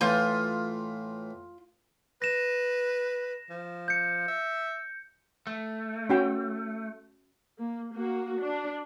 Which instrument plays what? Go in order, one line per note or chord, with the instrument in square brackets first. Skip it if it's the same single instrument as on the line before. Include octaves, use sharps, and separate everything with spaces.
[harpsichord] A2 E3 [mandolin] F4 G6
[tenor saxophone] B4 [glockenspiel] A#6 E7
[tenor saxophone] F3
[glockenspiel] G6 C#7
[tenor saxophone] E5
[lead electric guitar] A3
[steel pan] C#4 F#4 G5
[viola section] A#3
A#3 F#4
D4